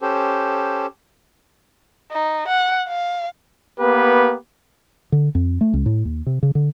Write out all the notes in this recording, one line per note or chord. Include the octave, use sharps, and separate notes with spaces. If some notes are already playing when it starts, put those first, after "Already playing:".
C#4 G4 A4 C5
D#4
F#5
F5
A#3 B3 G4 B4
D3
F2
A3
C#2
A2
D#2
C3
C#3
D3